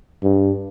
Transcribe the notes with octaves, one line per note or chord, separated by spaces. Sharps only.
G2